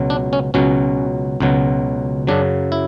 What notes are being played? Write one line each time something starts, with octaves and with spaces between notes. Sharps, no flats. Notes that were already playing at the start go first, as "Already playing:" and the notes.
Already playing: C#2 B2 F#3
D4
C#4
C#2 B2 F#3 C#4
C#2 B2 F#3
F#2 C#3 F#3 D4
E4